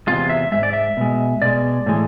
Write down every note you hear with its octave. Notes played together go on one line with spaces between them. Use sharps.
E2 C3 G#3 F4
E5
G#2 G#3 E5
D5
E5
B2 G#3
B2 G#3 D5
A2 E3 G#3